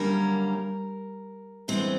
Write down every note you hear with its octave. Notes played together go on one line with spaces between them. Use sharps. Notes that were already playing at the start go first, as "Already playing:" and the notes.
Already playing: F#2 D3 G3 A#3 C#4 A#4
G2 E3 G#3 B3 C4 C5